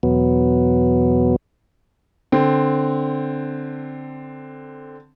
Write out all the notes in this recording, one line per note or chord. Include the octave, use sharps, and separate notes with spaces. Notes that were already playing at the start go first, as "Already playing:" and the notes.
E2 B2 F#3 B3
D3 C4